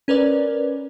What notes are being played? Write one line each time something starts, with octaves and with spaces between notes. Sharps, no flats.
C#4 A#4 B4 D5